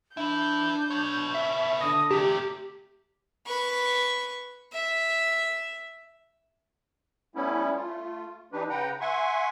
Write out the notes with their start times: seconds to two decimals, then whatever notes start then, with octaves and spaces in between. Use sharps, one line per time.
0.17 D4 E4 B4 G6
0.90 B3 C#5
1.34 E5
1.81 D3 D#6 A#6
2.11 C3 A3 G4 D6
3.47 B4 C#6
4.73 E5
7.36 G3 A3 B3 C#4 E4
7.75 A3 F4
8.52 E3 D4 D#4 G4 B4
8.70 C#3 B4 F#5 G5 A#5
9.01 E5 F#5 G#5 C6 C#6